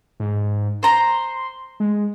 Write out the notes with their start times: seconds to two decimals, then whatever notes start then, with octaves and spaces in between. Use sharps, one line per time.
0.20 G#2
0.83 C5 A#5 C6
1.80 G#3